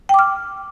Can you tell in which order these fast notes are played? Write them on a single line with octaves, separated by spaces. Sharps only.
G5 D6 F6